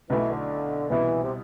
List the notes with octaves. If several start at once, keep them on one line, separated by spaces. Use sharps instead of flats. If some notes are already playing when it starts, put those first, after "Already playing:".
B1 B2 E3 A3 E4
D3
C2 B2 E3 B3 E4
C3